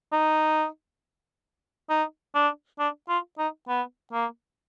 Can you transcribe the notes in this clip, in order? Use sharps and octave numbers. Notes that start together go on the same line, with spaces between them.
D#4
D#4
D4
D4
F4
D#4
B3
A#3